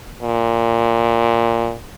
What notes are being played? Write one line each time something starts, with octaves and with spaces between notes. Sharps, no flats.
A#2